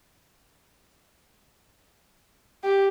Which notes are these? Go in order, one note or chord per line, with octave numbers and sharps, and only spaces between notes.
G4